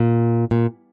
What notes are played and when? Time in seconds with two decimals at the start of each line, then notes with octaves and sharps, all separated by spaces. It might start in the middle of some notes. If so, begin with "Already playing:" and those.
Already playing: A#2
0.51 A#2